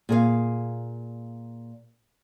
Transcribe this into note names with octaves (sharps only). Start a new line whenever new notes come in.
A#2 G#4 C#5 F5